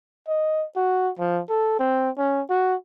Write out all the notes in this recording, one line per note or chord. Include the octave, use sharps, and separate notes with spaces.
D#5
F#4
F3
A4
C4
C#4
F#4